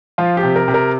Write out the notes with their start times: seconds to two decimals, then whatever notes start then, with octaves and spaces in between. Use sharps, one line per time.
0.18 F3 F4
0.37 G4
0.43 C3
0.56 A#4
0.68 C3
0.74 A#4